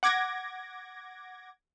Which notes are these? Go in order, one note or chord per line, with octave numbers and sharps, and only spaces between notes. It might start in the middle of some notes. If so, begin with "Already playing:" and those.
F#5 D6 G#6 A#6